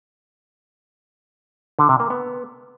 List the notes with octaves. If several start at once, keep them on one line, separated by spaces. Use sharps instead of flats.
D3
C3
A#3
B3